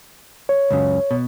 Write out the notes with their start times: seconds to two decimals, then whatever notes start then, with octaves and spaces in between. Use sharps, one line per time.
0.49 C#5
0.70 C#2 F#2 C#3
1.11 B2